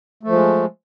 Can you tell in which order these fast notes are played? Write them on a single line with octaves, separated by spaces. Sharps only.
A3 F3 G#3